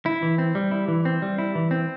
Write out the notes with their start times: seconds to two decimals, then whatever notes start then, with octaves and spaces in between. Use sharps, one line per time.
0.06 E4
0.22 E3
0.38 C4
0.55 G3
0.71 E4
0.88 E3
1.05 C4
1.22 G3
1.38 E4
1.55 E3
1.71 C4